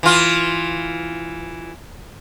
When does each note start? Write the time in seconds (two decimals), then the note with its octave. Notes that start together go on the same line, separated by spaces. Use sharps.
0.03 E3 F4